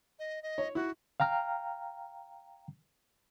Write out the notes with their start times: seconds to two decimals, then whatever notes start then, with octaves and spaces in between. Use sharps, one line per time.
0.19 D#5
0.43 D#5
0.58 C#5
0.75 E4 F#4
1.20 F5 G5 A#5 F6